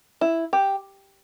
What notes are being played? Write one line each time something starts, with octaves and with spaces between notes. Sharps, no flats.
E4
G4